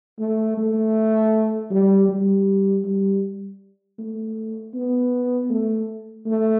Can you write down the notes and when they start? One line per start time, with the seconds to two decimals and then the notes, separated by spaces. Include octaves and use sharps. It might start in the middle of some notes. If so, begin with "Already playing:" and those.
0.19 A3
0.58 A3
1.71 G3
2.09 G3
2.84 G3
3.99 A3
4.74 B3
5.50 A3
6.26 A3